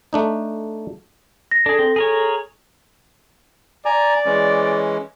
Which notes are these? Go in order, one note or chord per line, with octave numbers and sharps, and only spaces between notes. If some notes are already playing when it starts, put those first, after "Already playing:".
A3 D4 D#4
A#6
D4 G#4 A4
C4
G#4 A#4 C#5
D5 G#5 A#5
E3 G#3 C#4